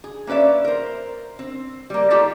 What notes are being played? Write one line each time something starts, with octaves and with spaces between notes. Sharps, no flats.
G#4
A#3 C#4 B4 D5 E5
A#4 C5
C4
G3 A#3
A3 D#4 F4 G4 D5 A5